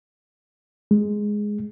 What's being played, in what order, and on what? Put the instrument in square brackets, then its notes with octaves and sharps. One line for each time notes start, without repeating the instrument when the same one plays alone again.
[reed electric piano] G#3